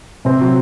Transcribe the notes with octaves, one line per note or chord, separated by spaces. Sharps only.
C3 C4
F#3